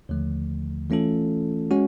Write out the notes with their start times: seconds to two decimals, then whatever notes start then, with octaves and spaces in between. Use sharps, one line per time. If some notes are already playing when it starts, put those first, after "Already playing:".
0.09 D#2 D3 F3 A3
0.90 E3 A3 C#4 F4 A4
1.71 G#3 C#4 F#4